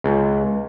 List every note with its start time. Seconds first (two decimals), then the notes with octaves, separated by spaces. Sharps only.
0.04 C#2